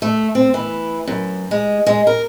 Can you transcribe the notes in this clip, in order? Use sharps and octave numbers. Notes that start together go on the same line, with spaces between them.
A3
C4
E3
F#2
G#3
G#3
A#4